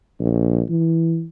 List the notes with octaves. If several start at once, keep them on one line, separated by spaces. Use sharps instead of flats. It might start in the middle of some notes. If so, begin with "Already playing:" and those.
A#1
E3